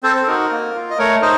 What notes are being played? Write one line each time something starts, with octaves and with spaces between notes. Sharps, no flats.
C4 A4 C5
C5
D#4 F#4 A#4
A#3
F4
D#5
A3 A#4 C#5
D#4 C5 D#5